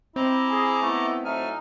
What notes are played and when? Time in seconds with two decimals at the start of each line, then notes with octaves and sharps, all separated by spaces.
0.16 C4 E4 D#5 A#5 D6
0.50 G#4
0.82 A3 B3 E4
1.24 A2 F#3 A3 D#4 G#5 F6